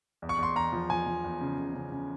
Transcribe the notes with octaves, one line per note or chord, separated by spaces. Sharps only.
E2
C#6
E2 C6
E2 A#5
F3
F3 G#5
F3
E2
C#3
C#3
C#3
C#3